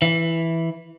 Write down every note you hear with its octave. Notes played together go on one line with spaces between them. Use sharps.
E3